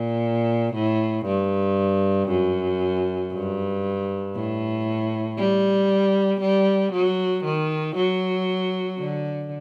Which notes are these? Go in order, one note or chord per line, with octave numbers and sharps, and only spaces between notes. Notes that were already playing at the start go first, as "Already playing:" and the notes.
Already playing: A#2
A2
G2
F#2
G2
A2
G3
G3
F#3
D#3
F#3
D3